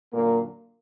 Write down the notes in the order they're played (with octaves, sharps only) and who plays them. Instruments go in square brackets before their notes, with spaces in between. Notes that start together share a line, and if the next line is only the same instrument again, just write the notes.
[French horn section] F#2 A#2 D3 F#3 A#3